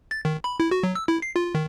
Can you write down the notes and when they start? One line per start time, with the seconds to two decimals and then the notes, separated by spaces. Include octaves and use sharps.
0.11 A6
0.25 D#3
0.44 B5
0.60 E4
0.71 F#4
0.83 F#3
0.95 E6
1.08 E4
1.22 C7
1.36 F4
1.55 D#3